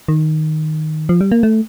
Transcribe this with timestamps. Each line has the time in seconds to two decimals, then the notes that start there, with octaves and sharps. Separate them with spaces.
0.08 D#3
1.09 F3
1.21 G3
1.32 A#3
1.43 A3